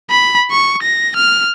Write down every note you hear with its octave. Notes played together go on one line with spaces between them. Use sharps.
B5
C#6
A#6
F6